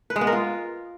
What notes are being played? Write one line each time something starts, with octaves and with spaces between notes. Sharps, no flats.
B4
G#3
B3
A#4
F4